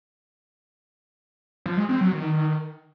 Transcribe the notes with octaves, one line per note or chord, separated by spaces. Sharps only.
F3
G#3
C4
F#3
D#3